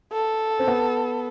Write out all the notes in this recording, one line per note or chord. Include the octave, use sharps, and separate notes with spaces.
A4
C4
B3